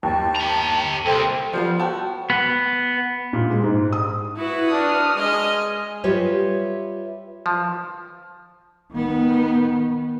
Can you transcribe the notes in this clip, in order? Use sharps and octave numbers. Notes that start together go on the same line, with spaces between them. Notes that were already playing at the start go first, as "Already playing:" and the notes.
D#2 G5 A5
G4 A#5
C2 A4 C5 G5
F3 G3 B3 B4
F#4 A4 G5 A5
B3
A#2
G#3
G#2
D#6
E4 F#4 B4
D4 D#6 F6
G#3 D#5 G#5
G3 F4 G4 B4 C#5 E5
F3
D#3 B3